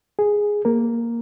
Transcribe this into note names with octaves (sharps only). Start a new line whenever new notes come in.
G#4
A#3 A#4